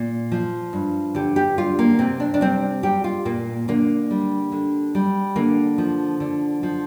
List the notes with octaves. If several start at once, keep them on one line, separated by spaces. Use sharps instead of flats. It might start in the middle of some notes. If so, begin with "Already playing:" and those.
Already playing: A#2
F3
G2
D3 G4
G4
G3 F4
A#3
C3 C4
D4
D4
G3 C4
G3 G4
F4
A#2 A#3
D3 A#3
G3
D3
G3
D3 A#3
F3
D3
F3